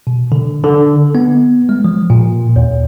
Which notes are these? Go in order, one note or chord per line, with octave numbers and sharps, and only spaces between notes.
B2
D3
D3
B3
G#3
F3
A#2
D#2